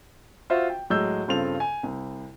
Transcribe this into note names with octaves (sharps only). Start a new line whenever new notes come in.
F4 F#4 C5 E5 F5
G5
A2 F#3 G#3 E6 G6
G2 C#3 C4 F4 A4 F7
G#5
C2